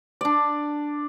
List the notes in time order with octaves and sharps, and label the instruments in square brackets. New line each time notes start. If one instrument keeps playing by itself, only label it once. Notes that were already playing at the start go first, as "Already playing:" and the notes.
[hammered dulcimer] D4 D5